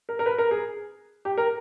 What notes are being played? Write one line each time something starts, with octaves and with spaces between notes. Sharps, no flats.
A#4
A#4
B4
A#4
G#4
G4
A#4